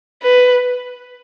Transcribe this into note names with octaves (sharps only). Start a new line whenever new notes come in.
B4